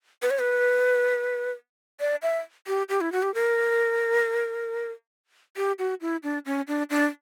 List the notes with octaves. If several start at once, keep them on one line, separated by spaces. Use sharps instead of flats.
B4
C#5
B4
D5
E5
G4
G4
E4
F#4
G4
A#4
G4
F#4
E4
D4
C#4
D4
D4